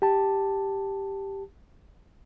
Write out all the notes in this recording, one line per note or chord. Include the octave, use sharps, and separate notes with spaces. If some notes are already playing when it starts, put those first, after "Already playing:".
G4 A5